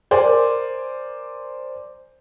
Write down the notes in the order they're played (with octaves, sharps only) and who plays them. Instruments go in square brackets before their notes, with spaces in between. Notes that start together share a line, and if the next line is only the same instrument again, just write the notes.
[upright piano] A#4 C5 D5 G#5